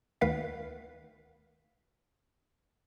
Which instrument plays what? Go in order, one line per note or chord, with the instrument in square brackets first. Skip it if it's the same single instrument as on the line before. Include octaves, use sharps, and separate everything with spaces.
[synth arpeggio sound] D2 D#3 B4 F5 F#5 B6